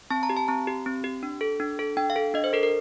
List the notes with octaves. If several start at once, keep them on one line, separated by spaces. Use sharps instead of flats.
C4 A5
A#5
G4
A5
C4 A#5
G4
C4
G4
D4
A4
D4
A4
D4 G5
F5
A4
D4 D#5
C5
A4 A#4
A#4